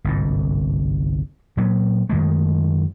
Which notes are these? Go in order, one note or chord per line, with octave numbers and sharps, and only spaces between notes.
G1 C2 G#2
A#2 F#3
F#2 D#3 G#3 A3